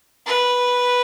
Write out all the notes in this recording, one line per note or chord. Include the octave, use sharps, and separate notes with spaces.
B4